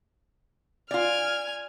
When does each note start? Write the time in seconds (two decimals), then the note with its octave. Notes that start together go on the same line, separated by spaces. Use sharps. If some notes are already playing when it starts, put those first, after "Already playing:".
0.91 F4 D5 G#5 F6